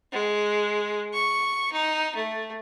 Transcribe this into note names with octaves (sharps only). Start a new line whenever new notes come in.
G#3
C#6
D#4
A3